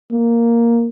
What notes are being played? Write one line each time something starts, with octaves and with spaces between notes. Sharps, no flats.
A#3